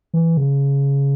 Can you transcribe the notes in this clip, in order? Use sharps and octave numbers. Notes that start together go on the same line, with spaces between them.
E3
C#3